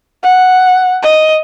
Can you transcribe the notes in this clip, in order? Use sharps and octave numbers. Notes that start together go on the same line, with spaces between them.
F#5
D#5